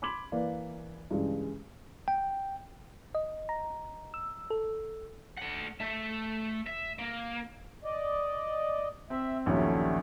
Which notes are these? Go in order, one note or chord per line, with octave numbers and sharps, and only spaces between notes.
B5 C6 D6 G#6 B6 F#7
E3 A#3 B4 D5 F5
G2 C#3 E3 G#3
G5
D#5
A#5
E6
A4
A3 F#5
A3 E5
E5
A#3
D5 D#5
C4 E5
A#1 D#2 F#3 G3 A3 C#4